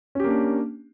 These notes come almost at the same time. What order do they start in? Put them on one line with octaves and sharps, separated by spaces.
C#4 G4 A#3 D4